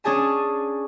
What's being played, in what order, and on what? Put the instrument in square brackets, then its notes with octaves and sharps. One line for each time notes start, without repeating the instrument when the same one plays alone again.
[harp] C#4 D4 G#4 G#5 A5